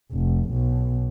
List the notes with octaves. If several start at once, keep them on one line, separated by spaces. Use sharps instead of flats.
F1
B1